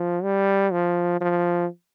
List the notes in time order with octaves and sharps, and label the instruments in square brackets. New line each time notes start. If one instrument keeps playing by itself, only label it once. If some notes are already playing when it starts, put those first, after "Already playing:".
Already playing: [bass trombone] F3
G3
F3
F3